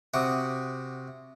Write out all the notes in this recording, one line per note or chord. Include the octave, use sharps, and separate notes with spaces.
C3 F#4 E5 D6 D#6